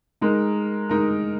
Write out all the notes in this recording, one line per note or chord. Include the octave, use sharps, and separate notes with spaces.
G#3 D#4 A#4
G#3 D#4 A#4